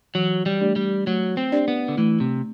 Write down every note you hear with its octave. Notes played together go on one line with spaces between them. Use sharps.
E3 F#3
G3
A3 D4 G4 D5
G3
F#3 A3
C4
D4 G4 D5
B3
D3
E3 A3
C3